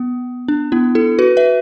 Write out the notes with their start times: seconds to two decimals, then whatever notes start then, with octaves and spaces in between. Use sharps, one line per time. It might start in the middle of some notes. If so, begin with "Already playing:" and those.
Already playing: B3
0.48 D4
0.72 B3 E4
0.95 E4 A4
1.19 F#4 B4
1.37 B4 E5